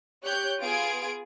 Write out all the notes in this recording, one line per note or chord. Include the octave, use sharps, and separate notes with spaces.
G4 C#5 F#6 G6
B3 F4 G#4 G#6 D7